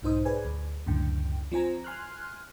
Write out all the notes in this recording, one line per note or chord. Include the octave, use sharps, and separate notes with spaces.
B1 G#2 D#4 C5 D#6
G#4 B4 C5 D5 G#5
D2
C#2 F#2 A2 D3 G5
F3 C4 C5 G#5 A#5
G#5 C6 F6 F#6